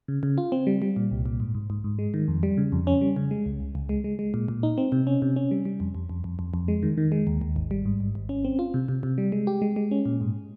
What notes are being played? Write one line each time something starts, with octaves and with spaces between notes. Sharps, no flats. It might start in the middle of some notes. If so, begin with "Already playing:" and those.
C#3
C#3
F4
C4
G3
G3
A#2
C2
A#2
G#2
G#2
G#2
G#2
G#3
D#3
F2
G3
C#3
F2
C#4
G3
C#3
G#3
C#2
C#2
C#2
G#3
G#3
G#3
A#2
A#2
D#4
C4
C3
C#4
C3
C#4
G3
G3
F2
F2
F2
F2
F2
F2
G#3
D#3
D#3
G#3
D#2
D#2
G#1
G3
G#2
G#1
G#1
C#4
C4
F4
C3
C3
C3
G3
G#3
G4
G#3
G#3
C#4
A#2
G#2